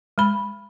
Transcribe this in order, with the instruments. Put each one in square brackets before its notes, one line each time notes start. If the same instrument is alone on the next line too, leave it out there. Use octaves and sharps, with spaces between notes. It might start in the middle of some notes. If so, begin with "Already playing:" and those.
[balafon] G#3 B5